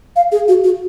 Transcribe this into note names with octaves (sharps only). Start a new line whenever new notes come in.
F5
G#4
F#4
F#4